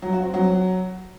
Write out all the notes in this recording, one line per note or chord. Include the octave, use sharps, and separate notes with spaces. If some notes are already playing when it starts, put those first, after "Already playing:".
F#3
F#4
C4
F#3